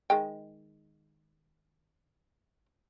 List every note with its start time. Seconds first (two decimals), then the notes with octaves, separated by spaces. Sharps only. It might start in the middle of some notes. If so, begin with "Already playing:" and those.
0.10 D#3 G#3 G5